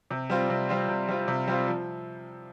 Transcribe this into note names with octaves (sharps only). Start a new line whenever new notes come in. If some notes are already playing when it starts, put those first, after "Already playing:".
C3
G3 C4 F4
C3
G3 C4 F4
C3
G3 C4 F4
C3
G3 C4 F4
F3